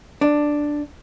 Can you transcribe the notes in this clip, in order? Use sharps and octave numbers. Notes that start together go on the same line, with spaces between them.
D4